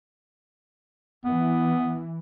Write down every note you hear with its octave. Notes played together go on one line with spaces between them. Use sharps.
E3 B3